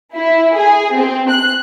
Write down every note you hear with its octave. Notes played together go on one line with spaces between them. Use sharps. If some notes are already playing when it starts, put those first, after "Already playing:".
E4
G#4
C4
F#6